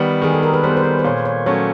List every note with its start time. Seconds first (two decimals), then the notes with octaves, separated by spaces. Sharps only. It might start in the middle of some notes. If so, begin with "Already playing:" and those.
Already playing: D#3 G3 B3
0.22 D#3 G#4
0.34 A4
0.43 A#4
0.53 B4
0.64 G3 B3 C5
0.77 C5
0.84 B4
0.99 C5
1.04 A#2 C#5
1.25 C#5
1.46 F#3 A3 C#4 C#5